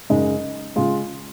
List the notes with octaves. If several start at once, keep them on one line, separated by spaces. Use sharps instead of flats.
F#2 C#3 G#3 D#4
C#3 G#3 F4